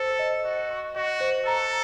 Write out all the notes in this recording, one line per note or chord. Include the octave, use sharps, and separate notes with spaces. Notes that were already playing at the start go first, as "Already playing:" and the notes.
Already playing: A4 C5
D#5
F#4 D#5
C#6
F#4 D#5
C5
A4 A#5